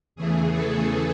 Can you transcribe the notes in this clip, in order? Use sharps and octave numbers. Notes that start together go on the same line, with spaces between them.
E2 C#3 E3 A3 G#4
A4